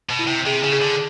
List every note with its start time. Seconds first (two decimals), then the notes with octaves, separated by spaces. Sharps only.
0.09 B2
0.19 E4
0.28 C3
0.46 C3 G#4
0.64 C#3
0.73 G#4
0.82 D3